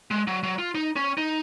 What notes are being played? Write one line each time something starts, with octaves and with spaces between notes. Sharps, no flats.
G#3
F#3
F#3
F4
D#4
C#4
D#4